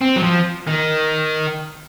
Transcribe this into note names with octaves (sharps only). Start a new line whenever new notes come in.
C4
F#3
F3
D#3